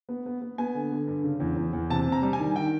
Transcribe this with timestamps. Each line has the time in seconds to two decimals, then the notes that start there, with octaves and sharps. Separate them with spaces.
0.09 B3
0.26 B3
0.42 B3
0.58 B3 G#5
0.75 D3
0.92 D3
1.07 G2
1.24 C#3
1.40 E2
1.56 E2
1.73 E2
1.90 C3 A5
2.06 C3
2.12 A#5
2.22 G3
2.33 G#5
2.39 D#3
2.56 D#3 G5